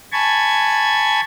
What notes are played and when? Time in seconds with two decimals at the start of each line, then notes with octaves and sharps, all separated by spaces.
0.12 G#5 A5 B5 C#6 G#6